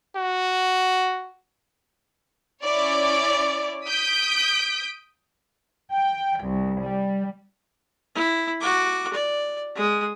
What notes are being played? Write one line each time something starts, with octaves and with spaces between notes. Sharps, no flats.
F#4
C#4 E4 C#5 D5
D#6 G6 B6 D7
G5
C2
G3
E4
F#4 D6
D5
G#3 D#6